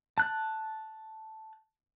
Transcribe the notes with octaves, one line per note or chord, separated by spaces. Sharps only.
A5 F#6